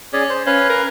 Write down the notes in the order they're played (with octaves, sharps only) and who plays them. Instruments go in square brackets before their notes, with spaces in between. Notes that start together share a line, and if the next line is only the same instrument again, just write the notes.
[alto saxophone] C#4 [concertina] G#4 D5
[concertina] C5
[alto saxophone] C#4 [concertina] B4 F5
[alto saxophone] A#4